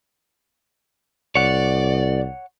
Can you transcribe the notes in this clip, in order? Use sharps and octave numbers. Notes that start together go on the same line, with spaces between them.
C2 C#5 D5 F#5